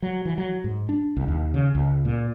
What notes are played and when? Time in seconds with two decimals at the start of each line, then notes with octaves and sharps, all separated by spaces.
0.02 F#3
0.25 E3
0.38 F#3
0.64 G#2
0.89 D4
1.17 C2
1.28 D#2
1.54 C#3
1.75 C#2
2.05 A#2